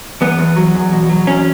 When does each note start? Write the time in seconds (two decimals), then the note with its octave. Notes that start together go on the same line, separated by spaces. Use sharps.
0.21 E2 B3
0.38 E2
0.56 F#3
0.74 E2
0.92 B2
1.10 F#3
1.27 E2 C#4